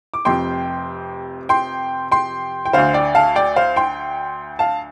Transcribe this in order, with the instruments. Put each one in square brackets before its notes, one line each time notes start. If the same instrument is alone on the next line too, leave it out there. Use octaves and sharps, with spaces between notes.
[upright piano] D6
F1 F2 C3 G5 C6
G5 C6
G5 C6
G5
D2 D3 C5 F5
D5 G5
F5 A5
D5 G5
C5 F5
G5 C6
F5 A5